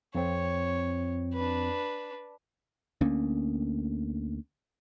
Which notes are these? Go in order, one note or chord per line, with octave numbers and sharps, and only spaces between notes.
F2 C4 C#5
D4 B4
D2 A#3 C#4